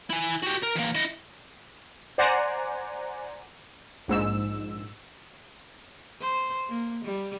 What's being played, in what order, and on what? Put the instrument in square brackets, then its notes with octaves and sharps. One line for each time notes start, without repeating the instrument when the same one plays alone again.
[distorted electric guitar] E4 G#5
F#4 G4
A#4
E2 A#3
E4 D#5
[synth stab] C5 D5 F#5 G#5 A#5
A#1 G#2 E6
[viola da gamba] C5
A#3
G3